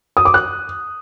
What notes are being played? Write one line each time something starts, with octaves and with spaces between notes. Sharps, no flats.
D#6
D6
F#6